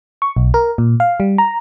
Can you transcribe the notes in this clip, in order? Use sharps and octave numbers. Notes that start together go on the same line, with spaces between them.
C#6
B1
A#4
A#2
F5
G3
A#5